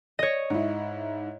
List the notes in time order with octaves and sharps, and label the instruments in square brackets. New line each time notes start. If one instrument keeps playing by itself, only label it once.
[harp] C#5 D#5
[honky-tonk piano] G#2 E4